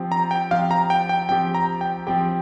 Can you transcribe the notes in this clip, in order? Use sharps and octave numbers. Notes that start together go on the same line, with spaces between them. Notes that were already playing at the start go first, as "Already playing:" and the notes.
Already playing: F3 C4 G4
A#5
G5
F3 C4 G4 F5
A#5
G5
G5
F3 C4 G4 G5
A#5
G5
F3 C4 G4 G5